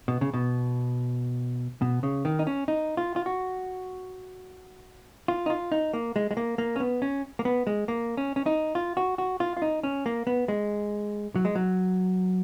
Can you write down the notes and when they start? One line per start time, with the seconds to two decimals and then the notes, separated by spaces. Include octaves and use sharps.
0.08 B2
0.21 C#3
0.34 B2
1.82 B2
2.03 C#3
2.25 D#3
2.39 D#4
2.47 C#4
2.68 D#4
2.97 F4
3.16 F4
3.26 F#4
5.28 F4
5.46 D#4
5.50 F4
5.72 D#4
5.94 A#3
6.16 G#3
6.31 G#3
6.37 A#3
6.58 A#3
6.76 C#4
6.80 B3
7.02 C#4
7.39 A#3
7.45 B3
7.67 G#3
7.88 A#3
8.17 C#4
8.36 C#4
8.46 D#4
8.75 F4
8.97 F#4
9.18 F#4
9.40 F4
9.57 F4
9.62 D#4
9.83 C#4
10.06 A#3
10.27 B3
10.48 G#3
11.36 F#3
11.45 G#3
11.55 F#3